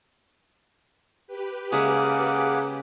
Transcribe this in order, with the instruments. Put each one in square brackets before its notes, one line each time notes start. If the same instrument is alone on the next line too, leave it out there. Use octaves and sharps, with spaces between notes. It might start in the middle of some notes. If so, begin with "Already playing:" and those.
[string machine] G4 B4
[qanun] C#3 G#3 E5 [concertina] A#3 F#5 D6 [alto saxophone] G#4